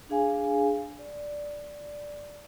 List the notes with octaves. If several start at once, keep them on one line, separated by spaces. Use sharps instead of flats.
D4 G#4 F5 G#5
D5